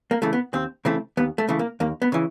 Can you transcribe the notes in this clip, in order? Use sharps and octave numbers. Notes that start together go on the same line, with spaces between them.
A#3
C#3 E3 A3
B3
D#2 C4
C#3 E3 A3 C4
D#2 B3
A3
C#3 E3 A3
A#3
D#2 A#3
B3
C#3 E3